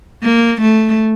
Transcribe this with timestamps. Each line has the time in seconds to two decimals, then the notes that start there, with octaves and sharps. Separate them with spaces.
0.23 A#3
0.61 A3